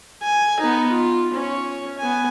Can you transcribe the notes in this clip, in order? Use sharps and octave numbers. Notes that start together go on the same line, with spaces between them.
G#5
B3 D#4
F4
C#4 C#5
B3 G#5